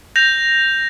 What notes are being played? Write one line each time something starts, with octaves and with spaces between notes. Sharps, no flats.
G6 A#6 F7